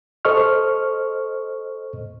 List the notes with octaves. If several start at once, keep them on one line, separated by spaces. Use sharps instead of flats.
A4 C5 D#5 C#6 F6